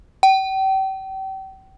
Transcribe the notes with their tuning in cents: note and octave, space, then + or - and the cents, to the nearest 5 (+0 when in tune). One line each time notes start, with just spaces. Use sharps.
G5 -35